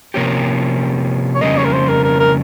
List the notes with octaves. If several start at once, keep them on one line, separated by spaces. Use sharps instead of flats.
C3 F3 A#3 C#4 G4
C#5
F2 C#3 G3 A#3 D#5
C#5
A#4
C5
A#4
A#4
A#4